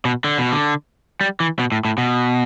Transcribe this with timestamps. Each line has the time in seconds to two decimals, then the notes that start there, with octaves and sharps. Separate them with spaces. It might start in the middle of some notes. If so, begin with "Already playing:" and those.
0.05 B2
0.24 D3
0.38 B2
0.52 D3
1.21 G3
1.40 E3
1.59 B2
1.72 A2
1.85 A2
1.98 B2